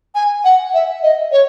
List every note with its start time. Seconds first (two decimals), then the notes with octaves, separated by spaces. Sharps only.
0.15 G#5
0.44 F#5
0.74 E5
1.03 D#5
1.32 C#5